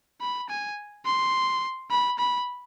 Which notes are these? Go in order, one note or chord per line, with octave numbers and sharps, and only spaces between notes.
B5
G#5
C6
B5
B5